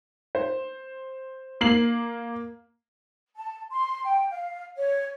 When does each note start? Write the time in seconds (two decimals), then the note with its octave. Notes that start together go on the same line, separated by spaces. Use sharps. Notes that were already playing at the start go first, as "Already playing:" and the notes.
0.35 C5
1.61 A#3 C7 F#7
3.35 A5
3.70 C6
4.04 G5
4.30 F5
4.77 C#5